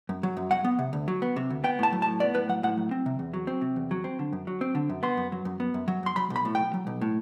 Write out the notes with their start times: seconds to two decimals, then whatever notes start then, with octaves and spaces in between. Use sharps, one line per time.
0.09 F#2
0.23 F#3
0.37 F#2
0.51 F#3 F#5
0.65 B3
0.79 C3
0.93 D2
1.08 F#3
1.22 B3
1.36 C3
1.50 D2
1.64 B3 G5
1.79 A2 A5
1.93 F#3
2.02 A5
2.06 A2
2.20 B3 D5
2.34 A2 B4
2.49 F#3 F#5
2.63 A2 F#5
2.78 F#3
2.91 C4
3.06 C3
3.19 E2
3.34 F#3
3.47 C4
3.61 C3
3.76 E2
3.91 F#3
4.04 C4
4.19 D3
4.33 F#2
4.47 F#3
4.61 C4
4.75 D3
4.89 F#2
5.03 B3 C6
5.17 F#2
5.32 F#3
5.45 F#2
5.60 B3
5.74 F#2
5.88 F#3
6.03 F#2 C6
6.16 F#3 B5
6.30 B1
6.36 B5
6.45 A2
6.55 B1 G5
6.74 F#3
6.87 B1
7.01 A2